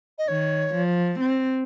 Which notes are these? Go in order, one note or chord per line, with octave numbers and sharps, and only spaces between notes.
D#5
D#3 C#5
F3
C4